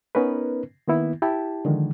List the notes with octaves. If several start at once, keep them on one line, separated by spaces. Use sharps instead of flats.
B3 C#4 D#4 A#4 B4
D#3 A#3 B3 E4
E4 G4 G5 A5
D3 D#3 F3 G#3